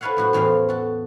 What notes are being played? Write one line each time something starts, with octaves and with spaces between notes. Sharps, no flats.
E4 A4 B4 C#5 F5 F#5
F#2 A2 F#4 C5
E2 A2 E3 F3 F5
F#4 A4